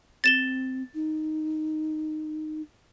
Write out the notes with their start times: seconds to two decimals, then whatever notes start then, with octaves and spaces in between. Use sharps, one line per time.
0.24 C4 A6 E7 G7
0.95 D#4